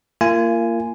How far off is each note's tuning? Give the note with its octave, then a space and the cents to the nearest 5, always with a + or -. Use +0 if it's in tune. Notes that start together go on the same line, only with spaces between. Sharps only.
A#3 -15 F4 -35 G#5 +0